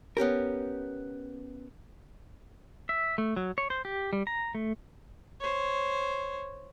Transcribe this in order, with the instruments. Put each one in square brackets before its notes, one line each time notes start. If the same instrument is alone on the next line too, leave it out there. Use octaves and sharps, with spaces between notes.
[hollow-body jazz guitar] B3 C#4 G4 A#4
[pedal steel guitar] E5
A3
F#3
C#5
C5
G4
G3
A#5
A3
[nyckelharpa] C5 C#5